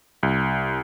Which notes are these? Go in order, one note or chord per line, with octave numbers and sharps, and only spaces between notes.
C2